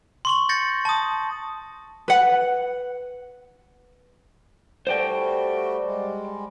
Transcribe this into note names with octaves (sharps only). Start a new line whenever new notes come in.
C6 C#6 F#7
G6 A6 A#6 C#7
A5 D#6
B4 F#5
G3 A3 F#4 C5 D5 G5
G3 G#3